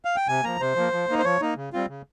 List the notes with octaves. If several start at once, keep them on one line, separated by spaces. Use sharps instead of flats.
F5
G5
C3 G#5
F3 A#3 A#5
C3 C5
F3 A#3
F3
A#3 D#4
C5
F3 C#5
A#3 D#4
C#3
G3 C4 F4
C#3